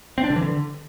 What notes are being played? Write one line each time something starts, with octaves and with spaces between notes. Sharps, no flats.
C4
D4
D3
E3
D3